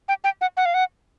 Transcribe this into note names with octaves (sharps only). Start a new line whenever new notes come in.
G5
G5
F#5
F#5
F5
F#5